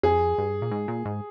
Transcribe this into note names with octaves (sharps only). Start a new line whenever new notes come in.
F2 G#4
G2
A#2
G#2
A#2
G#2